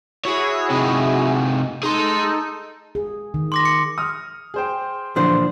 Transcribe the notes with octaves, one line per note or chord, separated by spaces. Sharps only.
E4 F#4 G#4 C#5
C3 D#4
D#4 G#4 A4 C6
G#4
D#3
C6 D6 A#6
C#7
D#6 F6
G#4 C5 G5
A#2 D3 E3 F3 D4 C5